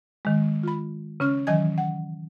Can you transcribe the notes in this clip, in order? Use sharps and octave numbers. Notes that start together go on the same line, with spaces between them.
D#3 G#3
F4 B5
C#3 C#4 F6
D#3 E3 F#3 D#5 G#5 G#6
F#5